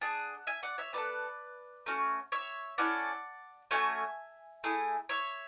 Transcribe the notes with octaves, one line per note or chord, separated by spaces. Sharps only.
D4 G#4 F#5 A5
E5 G#5
D5 F#5
C#5 E5
B3 F#4 A4 B4 D5
A3 C#4 F#4
C#5 E5
C#4 E4 A4 D5 F#5
A3 C#4 F#4 E5 G#5
A3 E4 G#4
C#5 E5